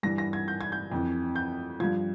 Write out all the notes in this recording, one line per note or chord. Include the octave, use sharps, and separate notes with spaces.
G2 E3 A#6
A#6
G#6
G6
G#6
G6
F2 E3
G6
G2 F3 G#6